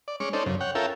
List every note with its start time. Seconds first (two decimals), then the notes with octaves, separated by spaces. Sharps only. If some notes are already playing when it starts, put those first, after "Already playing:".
0.08 D5
0.20 G#3 C#4 C#6 D6
0.33 C#4 D#4 A4 C5 D5
0.46 F#2 C#3
0.61 C#5 F#5 G5
0.75 C#4 F4 A4 A#4 E5 G5